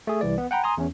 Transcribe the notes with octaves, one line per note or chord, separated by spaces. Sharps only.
A3 G#4
C2 E3 D5
B3
F#5 G5 A#5 B5
G#5 A#5 C6 D#6
E2 C#4